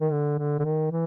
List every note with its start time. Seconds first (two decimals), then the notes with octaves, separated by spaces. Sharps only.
0.01 D#3
0.11 D3
0.38 D3
0.59 D3
0.64 D#3
0.91 E3